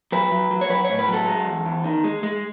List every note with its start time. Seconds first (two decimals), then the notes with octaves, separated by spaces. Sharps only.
0.12 F#3 B4
0.32 F#3
0.51 F#3
0.61 C#5
0.70 F#3 B4
0.84 A2 C#5
0.99 B4
1.08 F#3 A4
1.27 G#3
1.47 E2
1.66 E2
1.84 D#3
2.04 G#3
2.23 G#3